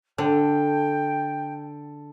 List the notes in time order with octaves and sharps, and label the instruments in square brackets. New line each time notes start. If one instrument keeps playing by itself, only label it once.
[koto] D3 [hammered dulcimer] A4 [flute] G5